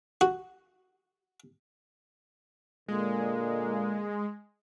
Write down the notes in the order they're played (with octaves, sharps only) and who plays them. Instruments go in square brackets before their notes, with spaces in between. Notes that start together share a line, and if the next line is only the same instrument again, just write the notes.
[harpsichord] F#4
[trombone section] A#2 D3 A#3 [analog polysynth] G#3